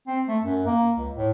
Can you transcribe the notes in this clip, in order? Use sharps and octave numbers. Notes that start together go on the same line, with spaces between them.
C4
A3
F#2
A#3
C#2
A2